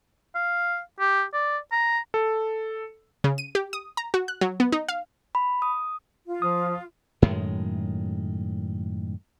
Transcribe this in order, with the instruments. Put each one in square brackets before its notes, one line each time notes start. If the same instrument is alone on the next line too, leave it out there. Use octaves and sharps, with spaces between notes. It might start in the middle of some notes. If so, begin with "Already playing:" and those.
[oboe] F5
G4
D5
A#5
[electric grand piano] A4
[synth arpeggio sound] C#3
D#7
G4
D#6
A#5
F#4
F#6
F#3
B3
D#4
F5
[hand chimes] B5
D#6
[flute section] F4
[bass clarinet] F3 [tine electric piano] D#6
[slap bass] F#2 A2 D#3 G#3